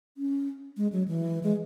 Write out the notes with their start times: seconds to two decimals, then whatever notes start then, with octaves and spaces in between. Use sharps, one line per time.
0.18 C#4
0.77 G#3
0.92 F#3
1.08 E3
1.43 G#3